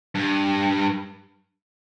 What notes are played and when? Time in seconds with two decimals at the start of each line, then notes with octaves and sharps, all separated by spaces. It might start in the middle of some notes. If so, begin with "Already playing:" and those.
0.15 G2